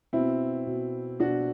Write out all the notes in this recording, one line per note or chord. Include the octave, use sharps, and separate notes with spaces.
B2 C4 E4
B2
B2 D4 F#4